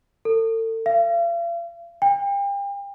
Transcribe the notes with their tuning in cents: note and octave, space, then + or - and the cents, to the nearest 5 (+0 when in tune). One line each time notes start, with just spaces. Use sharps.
A4 +35
F5 -45
G5 +35